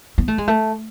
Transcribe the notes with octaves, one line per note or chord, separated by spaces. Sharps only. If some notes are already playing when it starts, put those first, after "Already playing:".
B3
A3
G#3
A3